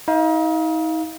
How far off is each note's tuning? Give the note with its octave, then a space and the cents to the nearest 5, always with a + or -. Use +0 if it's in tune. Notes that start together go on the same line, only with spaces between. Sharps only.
D#4 +40 F5 +0